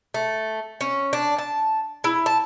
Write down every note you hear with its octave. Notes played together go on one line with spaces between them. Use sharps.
A3
C#4
D4
A5
E4
A5